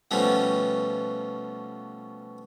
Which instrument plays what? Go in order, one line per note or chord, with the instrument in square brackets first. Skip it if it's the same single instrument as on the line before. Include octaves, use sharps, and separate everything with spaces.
[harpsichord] B2 F3 G3 A3 B3 C#4